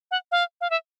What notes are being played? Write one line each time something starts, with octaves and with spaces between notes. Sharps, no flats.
F#5
F5
F5
E5